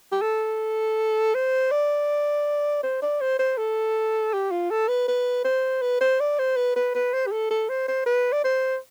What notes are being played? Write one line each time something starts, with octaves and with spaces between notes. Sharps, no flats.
G4
A4
C5
D5
C5
D5
C5
C5
A4
G4
F4
A4
B4
B4
C5
B4
C5
D5
C5
B4
B4
B4
C5
G4
A4
A4
C5
C5
B4
D5
C5